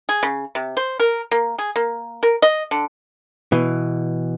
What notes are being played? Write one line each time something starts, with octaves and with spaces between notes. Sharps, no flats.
G#4
C#3
C3
C5
A#4
A#3
G#4
A#3
A#4
D#5
D3
B2 E3